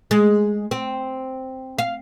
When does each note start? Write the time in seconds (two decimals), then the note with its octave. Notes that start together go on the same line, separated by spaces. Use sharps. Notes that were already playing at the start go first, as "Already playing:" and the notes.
0.11 G#3
0.71 C4
1.79 F5